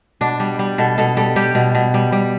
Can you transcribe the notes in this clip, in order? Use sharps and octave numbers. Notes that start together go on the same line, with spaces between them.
B2 D4
G3
G3
B2 A4
B2 A4
G3 A4
G3 G4
B2
B2
G3
G3